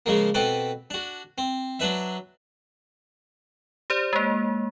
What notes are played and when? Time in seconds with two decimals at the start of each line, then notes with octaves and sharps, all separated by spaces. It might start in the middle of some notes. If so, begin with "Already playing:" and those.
0.06 C#3 F3 G#3 A#3
0.34 B2 C4 A4 B4 D6
0.90 D4 F#4
1.38 C4
1.80 F#3 D4 B4 E5
3.90 G4 C5 D5
4.13 G#3 A#3